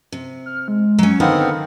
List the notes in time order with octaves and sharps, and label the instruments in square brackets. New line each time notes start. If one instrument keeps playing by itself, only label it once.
[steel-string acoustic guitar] C3
[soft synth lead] F6
G#3
[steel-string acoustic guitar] F#3 C#4
[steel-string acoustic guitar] D3 F#5 [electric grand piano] D#3 D#4 F5 [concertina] B3 C4 [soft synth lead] F6